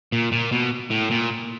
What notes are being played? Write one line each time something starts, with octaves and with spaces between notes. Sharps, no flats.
A#2
A#2
B2
A2
A#2